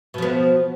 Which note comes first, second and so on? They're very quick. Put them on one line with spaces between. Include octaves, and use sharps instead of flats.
B2 F3 B3